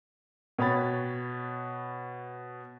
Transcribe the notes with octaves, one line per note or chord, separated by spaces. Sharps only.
B2 B4 C#5 G5 B5 A6